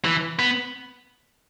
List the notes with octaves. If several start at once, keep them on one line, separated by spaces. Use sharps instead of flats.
E3
B3